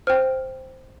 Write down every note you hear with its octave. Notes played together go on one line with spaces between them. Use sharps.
C5 G5 F6